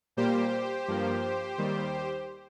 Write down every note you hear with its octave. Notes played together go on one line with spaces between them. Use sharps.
A#2 G3 A#3 G4 C5
G2 F3 A#3
D#2 D#3 G3